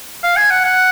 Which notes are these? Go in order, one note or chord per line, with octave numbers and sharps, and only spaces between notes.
F5
G#5
F#5
F#5